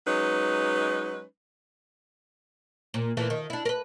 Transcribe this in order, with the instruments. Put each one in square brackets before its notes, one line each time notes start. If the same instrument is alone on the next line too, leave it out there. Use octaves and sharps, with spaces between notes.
[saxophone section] F#3 G#3 C#4 D#4 B4
[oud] A#2
A#2 E3 A3
D#3
D4 E4
A#4 B4